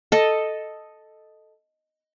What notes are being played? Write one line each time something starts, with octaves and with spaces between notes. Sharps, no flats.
A4 D#5